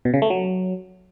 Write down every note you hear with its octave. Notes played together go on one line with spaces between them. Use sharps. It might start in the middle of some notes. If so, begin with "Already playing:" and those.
B2
C#3
A3
F#3